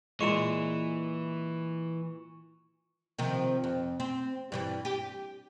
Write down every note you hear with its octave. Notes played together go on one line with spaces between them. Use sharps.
A#2 E3 G#3 C#6 C#7 E7
C3 D#3 F3
F2
C4
G2 E3 G3
G4